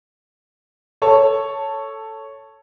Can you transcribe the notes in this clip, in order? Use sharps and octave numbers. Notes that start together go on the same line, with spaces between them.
A4 C#5 A5